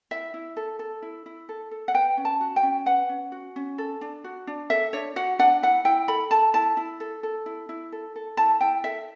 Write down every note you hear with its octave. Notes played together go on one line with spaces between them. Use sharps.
E4 E5
E4
A4
A4
E4
E4
A4
A4
F#5
B4 G5
C#4
A5
F#4
G5
C#4
B4 F#5
C#4
F#4
C#4
A4
D4
F#4
D4
A4 E5
D4 C#5
F#4 F#5
D4 F#5
E4 F#5
E4 G5
A4 B5
A4 A5
E4 A5
E4
A4
A4
E4
E4
A4
A4
E4 A5
E4 G5
A4 E5